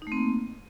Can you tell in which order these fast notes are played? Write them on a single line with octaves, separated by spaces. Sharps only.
D#4 A3 C4 A#3